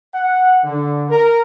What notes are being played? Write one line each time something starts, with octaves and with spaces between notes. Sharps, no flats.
F#5
D3
A#4